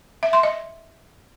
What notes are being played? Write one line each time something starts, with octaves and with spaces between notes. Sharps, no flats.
E5
C6
D#5